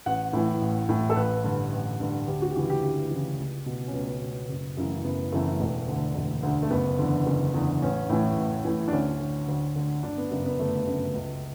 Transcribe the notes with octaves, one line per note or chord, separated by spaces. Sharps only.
A1 F#5
A2 E3
A1
A2 E3
A4
A1 B4
G2 D3
A1
G2 D3
D2 G4
F#4
G4
C#3 E3 F#4
G4
D2 G4
C#3 E3
C#2
B2
C#4
C#2 B3
B2
F#1
F#2 C#3 E3
F#1 B3
F#2 C#3 E3 A3
E1
D2 D3
E1
D2 D3
A3
F#1 B3
E2 D3
F#1
E2 D3
A1 C#4
A2 E3
A1
A2 E3
D4
D2 C#4
D3
D2
D3
G1 D4
B3
F#2 C#3
B3
G1 A3
F#2 C#3
C#2